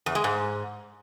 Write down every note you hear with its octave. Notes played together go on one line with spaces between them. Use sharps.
E2
G#3
G#2